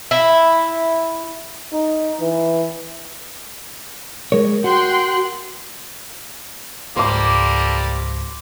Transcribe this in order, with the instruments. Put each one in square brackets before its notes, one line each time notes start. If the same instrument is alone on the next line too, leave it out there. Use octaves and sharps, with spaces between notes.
[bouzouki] E4
[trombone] D#4
E3
[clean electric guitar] G#3 C#5 [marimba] A#4
[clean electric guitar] F#4 [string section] G5 C6 F#6
[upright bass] C#2 G#2 [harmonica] G3 A#3 A4 [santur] C5 D6